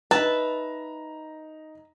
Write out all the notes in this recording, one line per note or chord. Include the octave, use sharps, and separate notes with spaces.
D#4 B4 E5 A5 A#5